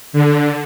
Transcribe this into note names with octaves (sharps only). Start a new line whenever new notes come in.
D3